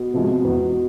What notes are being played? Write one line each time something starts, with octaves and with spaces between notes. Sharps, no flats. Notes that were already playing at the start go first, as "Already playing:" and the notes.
Already playing: B2
C3 F3 G#3
E2